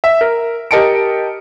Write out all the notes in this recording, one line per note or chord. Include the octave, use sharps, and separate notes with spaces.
E5
A#4
G4 A#4 D#5 A5 C#7 D7